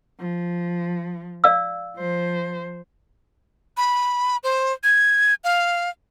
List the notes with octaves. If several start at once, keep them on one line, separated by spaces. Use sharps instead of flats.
F3
D5 F5 E6
F3 C5
B5
C5
G#6
F5